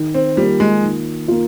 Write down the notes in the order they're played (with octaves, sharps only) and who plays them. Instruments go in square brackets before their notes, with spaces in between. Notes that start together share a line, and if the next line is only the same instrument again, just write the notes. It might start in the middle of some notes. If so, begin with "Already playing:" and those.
Already playing: [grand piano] D#3
[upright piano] C4
[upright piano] G3 [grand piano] A#3 F4
[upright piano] G#3
[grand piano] D#3
A#3 F4